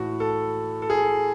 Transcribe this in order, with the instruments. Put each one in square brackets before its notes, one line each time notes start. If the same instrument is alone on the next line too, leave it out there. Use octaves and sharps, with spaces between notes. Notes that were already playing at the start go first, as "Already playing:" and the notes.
Already playing: [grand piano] A2 E3 F#4
A4
A4
G#4